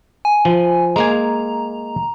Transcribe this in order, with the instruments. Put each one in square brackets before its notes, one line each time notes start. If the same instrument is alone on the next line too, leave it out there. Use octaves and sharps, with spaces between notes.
[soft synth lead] G#5
[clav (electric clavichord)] F3
[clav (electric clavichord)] G#3 A#3 G#5 [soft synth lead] A#5